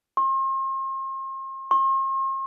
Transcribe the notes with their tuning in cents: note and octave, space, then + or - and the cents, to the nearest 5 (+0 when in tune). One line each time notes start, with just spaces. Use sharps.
C6 +40
C6 +45